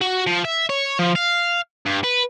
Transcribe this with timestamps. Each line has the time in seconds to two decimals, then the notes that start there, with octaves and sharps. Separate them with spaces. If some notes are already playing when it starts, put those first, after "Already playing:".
0.01 F#4
0.27 F3
0.45 E5
0.69 C#5
0.99 F3
1.15 F5
1.86 G2
2.04 B4